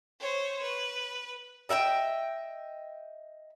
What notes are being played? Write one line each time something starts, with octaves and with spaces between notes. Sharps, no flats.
C5 C#5
B4
D#5 E5 F#5 G5